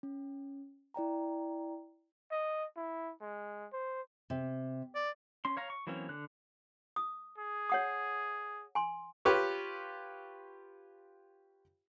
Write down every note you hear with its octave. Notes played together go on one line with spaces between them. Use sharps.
C#4
E4 D5 G5 A#5
D#5
E4
G#3
C5
C3
D5
C#4 C6
C#5 F5 A#5
C#6
E3 F#3 A#3 C4 C#4
D3 F#6
D#6
G#4
C#5 F#5 D#6
G#5 C6
F4 G4 B4 C#5